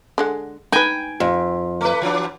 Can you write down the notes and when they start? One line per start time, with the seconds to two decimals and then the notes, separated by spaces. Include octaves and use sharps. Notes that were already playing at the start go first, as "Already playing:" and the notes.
0.18 D3 G#3 F#5
0.72 D#4 B4 G5 G#5
1.20 F2
1.81 A3 B4
2.01 E3 F#3 D4